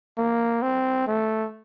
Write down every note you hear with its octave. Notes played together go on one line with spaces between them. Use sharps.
A#3
C4
A3